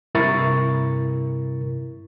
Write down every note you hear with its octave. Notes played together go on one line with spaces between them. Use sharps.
G2 C3 E4 A#4 C#6 A6